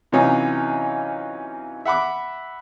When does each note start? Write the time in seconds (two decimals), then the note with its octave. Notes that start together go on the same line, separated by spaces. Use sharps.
0.12 C3 E3 F#3 C#4 D#4 F4
1.85 E5 F#5 B5 D6